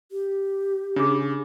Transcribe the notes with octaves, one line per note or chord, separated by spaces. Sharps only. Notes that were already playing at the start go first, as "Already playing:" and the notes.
G4
C#3 D4 G#4